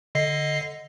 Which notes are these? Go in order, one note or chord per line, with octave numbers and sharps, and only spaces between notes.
D3 D#5 C7